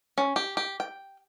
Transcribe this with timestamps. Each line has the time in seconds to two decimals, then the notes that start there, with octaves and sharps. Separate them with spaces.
0.18 C#4
0.36 G4
0.57 G4
0.80 G5